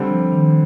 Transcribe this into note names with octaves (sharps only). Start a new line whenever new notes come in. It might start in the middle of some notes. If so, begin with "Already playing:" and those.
Already playing: D3 G3 C4
F3
D#3